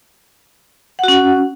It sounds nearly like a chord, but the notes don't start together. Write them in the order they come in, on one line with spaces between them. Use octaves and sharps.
F#5 F#4 C#4